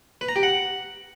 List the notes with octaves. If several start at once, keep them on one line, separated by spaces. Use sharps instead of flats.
B4
A#5
G4
F#5